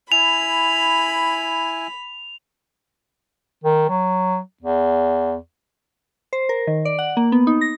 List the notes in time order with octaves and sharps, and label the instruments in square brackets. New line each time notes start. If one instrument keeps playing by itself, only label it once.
[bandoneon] E4 G#5 [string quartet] B5 [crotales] F7
[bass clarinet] D#3
F#3
E2
[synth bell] C5
A#4
D#3
D5
F#5
A#3
B3
D#4
A#6